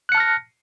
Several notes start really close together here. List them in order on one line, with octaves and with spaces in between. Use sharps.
F#6 C#7 A5 F6 A#6